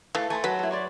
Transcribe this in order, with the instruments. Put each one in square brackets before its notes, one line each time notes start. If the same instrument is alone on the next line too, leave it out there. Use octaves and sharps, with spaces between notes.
[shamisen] E3 [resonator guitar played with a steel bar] A3 [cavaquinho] F5
[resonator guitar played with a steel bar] A3 [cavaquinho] G#5 B5 C6
[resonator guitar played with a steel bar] F#3 [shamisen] B4
[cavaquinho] E4 A4
D5 C6 C#6